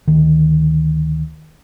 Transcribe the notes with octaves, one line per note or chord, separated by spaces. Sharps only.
D2 D#3